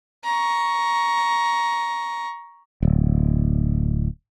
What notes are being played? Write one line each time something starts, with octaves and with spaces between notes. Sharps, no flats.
A#5 C#6
D1